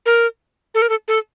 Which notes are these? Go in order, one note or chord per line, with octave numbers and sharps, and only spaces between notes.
A#4
A4
A#4
A4
A4